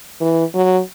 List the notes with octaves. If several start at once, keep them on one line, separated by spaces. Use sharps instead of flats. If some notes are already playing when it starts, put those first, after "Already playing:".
E3
F#3